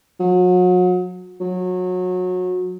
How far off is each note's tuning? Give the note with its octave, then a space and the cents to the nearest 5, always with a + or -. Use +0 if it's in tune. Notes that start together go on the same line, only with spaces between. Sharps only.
F#3 -35
F#3 -25